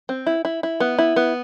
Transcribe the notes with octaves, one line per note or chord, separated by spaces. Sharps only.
C4
E4
E4
E4
B3
E4
B3